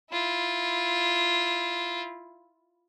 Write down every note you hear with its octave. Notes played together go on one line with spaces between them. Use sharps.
E4 F4